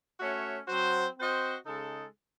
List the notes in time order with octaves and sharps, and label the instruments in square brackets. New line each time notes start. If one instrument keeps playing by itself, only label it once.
[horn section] A3 C#4 F#4 C#5 E5
F#3 C4 F#4 C5
C4 F#4 C5 D#5
C#3 G#3 D#4 A4